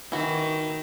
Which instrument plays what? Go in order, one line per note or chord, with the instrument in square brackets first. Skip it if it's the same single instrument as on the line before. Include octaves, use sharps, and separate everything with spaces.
[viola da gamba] D#3 [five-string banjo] E3 F#4